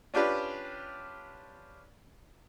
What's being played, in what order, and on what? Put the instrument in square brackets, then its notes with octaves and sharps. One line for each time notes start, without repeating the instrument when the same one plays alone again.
[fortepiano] C#4 D4 F4 G4 B4 D5